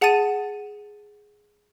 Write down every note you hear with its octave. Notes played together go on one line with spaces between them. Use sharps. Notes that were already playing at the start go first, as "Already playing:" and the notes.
G#4 F#5 A5 D#6 A6 D#7